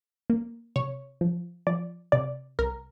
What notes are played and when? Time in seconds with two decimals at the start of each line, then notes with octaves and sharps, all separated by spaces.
0.30 A#3
0.76 C3 C#5
1.21 F3
1.67 F3 D5
2.12 C3 D5
2.59 C2 A#4